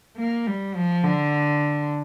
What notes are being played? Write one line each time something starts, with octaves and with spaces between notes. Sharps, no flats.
A#3
G3
F3
D3